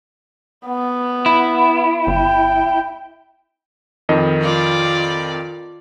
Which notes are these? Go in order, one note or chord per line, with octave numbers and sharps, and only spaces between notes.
B3
E4
G1 G5
F2 D#3 D#5
F4 D5